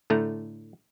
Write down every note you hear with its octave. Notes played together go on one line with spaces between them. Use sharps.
A2 D3 A3 A#5